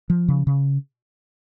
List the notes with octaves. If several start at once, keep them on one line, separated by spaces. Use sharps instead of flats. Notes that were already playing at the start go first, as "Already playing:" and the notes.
F3
C#3
C#3